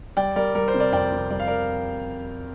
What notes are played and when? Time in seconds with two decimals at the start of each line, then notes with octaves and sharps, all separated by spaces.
0.17 G3 D5 G5
0.36 G3 A#4 D5
0.55 G3 A#4
0.68 C5
0.74 C3
0.80 A#4 D5
0.92 F2 D5 G5
1.12 C3
1.31 G3 D5
1.40 F5
1.47 A#4 D5